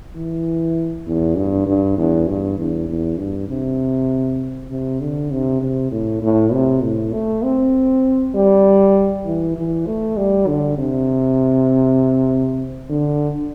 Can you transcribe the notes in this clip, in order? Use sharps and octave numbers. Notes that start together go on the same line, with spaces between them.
E3
E2
G2
G2
E2
G2
E2
E2
G2
C3
C3
D3
C3
C3
A2
A2
C3
A2
A3
C4
G3
E3
E3
A3
G3
D3
C3
D3